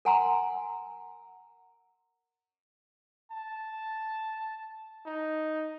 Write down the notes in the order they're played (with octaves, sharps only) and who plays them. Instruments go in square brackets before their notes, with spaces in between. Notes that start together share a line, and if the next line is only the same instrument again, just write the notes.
[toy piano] A#4 F#5 G#5 A#5 C6 E6
[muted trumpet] A5
D#4